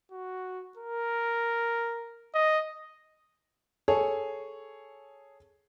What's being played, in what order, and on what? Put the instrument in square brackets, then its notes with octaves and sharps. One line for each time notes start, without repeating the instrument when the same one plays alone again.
[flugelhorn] F#4
A#4
D#5
[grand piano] G#4 A4 C#5